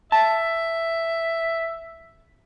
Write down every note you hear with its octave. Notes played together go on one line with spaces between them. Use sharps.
E5 A5